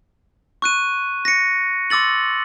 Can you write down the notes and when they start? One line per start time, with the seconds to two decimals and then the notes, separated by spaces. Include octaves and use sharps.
0.62 C#6 F#6 D#7
1.25 A#6 C#7
1.90 C6 D6 E6 A6 F#7